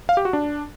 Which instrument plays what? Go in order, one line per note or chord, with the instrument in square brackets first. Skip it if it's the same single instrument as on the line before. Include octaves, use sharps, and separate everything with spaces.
[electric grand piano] F5
G4
F#4
D4